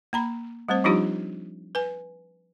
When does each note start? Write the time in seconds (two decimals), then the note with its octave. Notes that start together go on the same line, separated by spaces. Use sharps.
0.13 A#3 A#5 B5
0.69 G3 A3 C4 C5
0.84 F3 G3 D4 D#4 F4 G4
1.75 B4 G#5